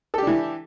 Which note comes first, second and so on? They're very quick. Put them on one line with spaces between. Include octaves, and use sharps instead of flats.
A4 G4 D4 E3